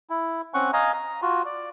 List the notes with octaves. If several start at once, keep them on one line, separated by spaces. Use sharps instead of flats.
E4
C4 C#4 F#5 C#6
D#5 F5 G#5 A#5
A#5
F4 F#4
D5